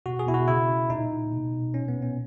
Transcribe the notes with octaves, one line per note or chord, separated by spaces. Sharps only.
B2 F#4
G#4
B2 E4
F#4
C#3 E4
C#3
A#2 D#4
A#2
B2
B2
A#2 C#4
B3
A#2
C#4